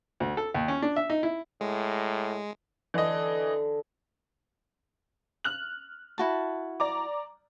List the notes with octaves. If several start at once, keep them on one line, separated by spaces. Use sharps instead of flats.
D2
A4
D#2
C#4
D4
E5
D#4
E4
A2 G#3
D3 E3 D#5
F6 F#6 F#7
E4 F#4 A5
D5 A#5 D6